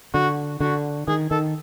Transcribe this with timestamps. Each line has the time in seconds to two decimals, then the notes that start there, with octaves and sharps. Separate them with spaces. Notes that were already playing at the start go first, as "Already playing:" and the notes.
0.14 D3 F#4
0.60 D3 F#4
1.08 D#3 G#4
1.31 D#3 A4